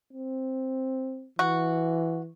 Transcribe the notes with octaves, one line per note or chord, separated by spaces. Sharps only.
C4
E3 F#4